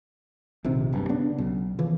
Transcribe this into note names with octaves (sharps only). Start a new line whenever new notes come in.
A#1 C3 D#3
F#1 G2
C#3 B3 D4
B1
C#3 E3 F3